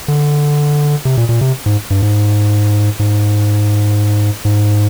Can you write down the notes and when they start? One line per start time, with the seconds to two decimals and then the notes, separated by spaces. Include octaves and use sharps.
0.08 D3
1.05 C3
1.18 A#2
1.29 A#2
1.41 C3
1.66 G#2
1.90 G2
2.02 G#2
2.99 G#2
4.45 G#2